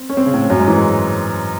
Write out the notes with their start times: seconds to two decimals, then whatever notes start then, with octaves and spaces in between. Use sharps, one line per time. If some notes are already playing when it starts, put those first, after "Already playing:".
Already playing: C4
0.09 C#4
0.17 C4
0.26 C#3
0.33 A2
0.50 F#2
0.59 G#2
0.68 E3
0.76 G#3